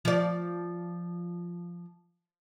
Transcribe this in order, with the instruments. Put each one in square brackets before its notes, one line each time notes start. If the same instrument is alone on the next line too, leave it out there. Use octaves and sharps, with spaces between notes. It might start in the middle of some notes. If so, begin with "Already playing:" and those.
[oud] F3 D5